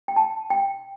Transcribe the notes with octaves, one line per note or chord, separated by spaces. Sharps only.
G5
A5
G5